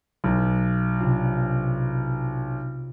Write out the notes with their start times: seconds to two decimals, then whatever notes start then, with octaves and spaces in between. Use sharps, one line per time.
0.24 B1
1.00 C3 D4 F4